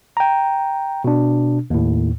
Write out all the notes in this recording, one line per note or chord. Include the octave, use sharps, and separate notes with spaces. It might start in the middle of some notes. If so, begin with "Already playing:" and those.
G5 A#5
B2 D4
D#2 A2